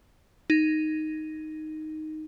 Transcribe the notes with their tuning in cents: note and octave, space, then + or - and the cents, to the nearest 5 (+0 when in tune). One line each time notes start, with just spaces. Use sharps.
D#4 +0